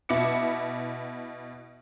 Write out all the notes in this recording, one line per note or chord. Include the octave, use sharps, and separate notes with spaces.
B2 E4 D6 C#7